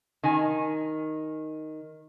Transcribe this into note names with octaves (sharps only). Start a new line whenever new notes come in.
D#3 G#5